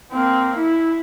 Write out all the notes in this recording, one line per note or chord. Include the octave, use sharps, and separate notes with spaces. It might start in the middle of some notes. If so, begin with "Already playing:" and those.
A#3 C4
E4